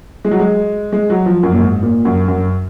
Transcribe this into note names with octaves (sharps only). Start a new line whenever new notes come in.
G#3
F#3
G#3
G#3
F#3
F3
F#2
A#2
G#2
A#2
F#2
F#2